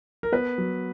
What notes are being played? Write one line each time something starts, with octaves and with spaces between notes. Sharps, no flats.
A#4
B3 B4
F#3